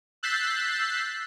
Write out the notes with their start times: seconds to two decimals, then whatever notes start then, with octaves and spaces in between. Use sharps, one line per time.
0.23 E6 F#6 G6 A6 B6 C7